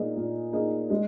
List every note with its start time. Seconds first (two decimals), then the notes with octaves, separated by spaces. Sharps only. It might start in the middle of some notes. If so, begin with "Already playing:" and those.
Already playing: A#2 A#3 D#4 G#4
0.16 A#2
0.53 A#3 D#4 G#4
0.90 G#3